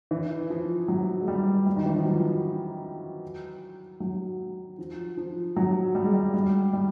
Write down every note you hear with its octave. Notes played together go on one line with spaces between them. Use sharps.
E3
F3
F#3
G#3
G3
G3
D#3
E3
F3
F#3
F#3
F3
F3
F#3
G3
G#3
G3
G3
G3